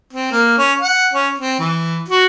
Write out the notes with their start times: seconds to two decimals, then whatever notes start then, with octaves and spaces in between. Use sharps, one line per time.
0.13 C4
0.31 A#3
0.58 C#4
0.81 F#5
1.13 C#4
1.38 C4
1.59 E3
2.08 F#4